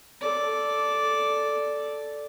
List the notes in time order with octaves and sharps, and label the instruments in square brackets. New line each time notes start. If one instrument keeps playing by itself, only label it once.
[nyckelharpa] A4 D5